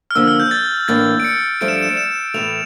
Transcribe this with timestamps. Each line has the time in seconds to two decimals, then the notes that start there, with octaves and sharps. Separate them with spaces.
0.11 F6
0.15 D3 F3 A#3 D4 E6
0.27 F6
0.40 G6
0.51 A6
0.88 A2 E3 A#3 D4 A6
1.20 D7
1.24 C#7
1.61 G2 F3 A3 D4 D7
1.68 E7
1.76 D7
1.83 E7
1.89 D7
1.97 E7
2.34 A2 E3 A3 F7